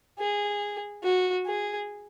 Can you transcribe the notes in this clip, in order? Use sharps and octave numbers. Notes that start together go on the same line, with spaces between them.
G#4
F#4
G#4